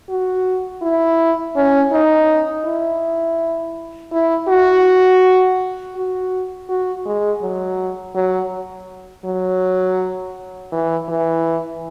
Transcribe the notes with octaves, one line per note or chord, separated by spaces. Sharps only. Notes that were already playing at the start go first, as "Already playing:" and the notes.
F#4
E4
C#4
D#4
E4
E4
F#4
F#4
F#4
G#3
F#3
F#3
F#3
E3
E3